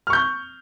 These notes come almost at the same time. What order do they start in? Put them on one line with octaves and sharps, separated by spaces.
F6 C#6 G6